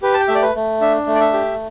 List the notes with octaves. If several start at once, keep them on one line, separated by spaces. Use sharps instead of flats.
G4 B4
A5
G5
A3 E5
D5
B4
A3
D4 E5
A3
D5
E5
G4